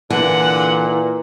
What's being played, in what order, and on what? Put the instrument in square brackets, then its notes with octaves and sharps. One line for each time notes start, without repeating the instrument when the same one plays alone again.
[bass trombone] A#2 [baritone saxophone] D3 [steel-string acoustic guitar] E3 [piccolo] F#5